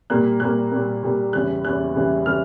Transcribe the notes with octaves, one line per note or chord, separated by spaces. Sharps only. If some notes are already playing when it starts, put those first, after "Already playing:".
A#2 G3 A#3 F#6
A#2 G3 A#3 F#6
A#2 G3 A#3
A#2 G3 A#3
E2 C#3 E3 G3 F#6
E2 C#3 E3 G3 F#6
E2 C#3 E3 G3
C#3 E3 G3 F6